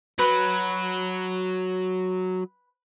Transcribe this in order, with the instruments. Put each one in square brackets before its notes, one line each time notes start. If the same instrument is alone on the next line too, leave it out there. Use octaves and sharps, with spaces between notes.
[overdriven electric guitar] F#3 [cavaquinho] B4